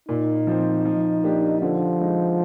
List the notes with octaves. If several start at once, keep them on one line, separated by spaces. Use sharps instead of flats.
A#2 D#4
F3 C4
F3
A#3 D4 G4
D3 F3
G#3 D#4